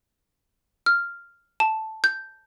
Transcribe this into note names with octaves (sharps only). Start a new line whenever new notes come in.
F6
A5
G6